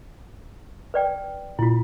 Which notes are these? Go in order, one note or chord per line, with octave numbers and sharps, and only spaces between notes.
B4 D5 G5
A#2 E4 F4